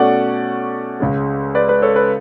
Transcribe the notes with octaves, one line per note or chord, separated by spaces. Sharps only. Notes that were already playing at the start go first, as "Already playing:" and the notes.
Already playing: B2 A3 C#4 D5 F#5
C#2 C#3 G#3
B4 D5
B4
A4 C#5
B4